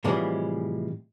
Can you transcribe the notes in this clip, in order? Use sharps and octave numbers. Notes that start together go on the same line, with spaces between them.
A2 C3 E3 F3 G3 G#3